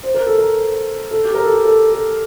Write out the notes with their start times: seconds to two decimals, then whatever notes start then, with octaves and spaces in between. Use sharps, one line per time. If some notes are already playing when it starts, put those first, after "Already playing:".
0.03 C5
0.14 A#4
0.27 A4
0.38 A#4
1.11 A4
1.25 G4
1.34 A#4
1.43 A4
1.52 G4
1.65 A4
1.92 A4